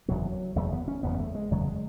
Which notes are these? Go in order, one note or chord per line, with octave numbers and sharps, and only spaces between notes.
F#1 E2 B2 F#3
F#1 E2 C#3 A3
B3
C#4
F#1 E2 C#3 B3
A3
G#3
F#1 E2 C#3 F#3
G#3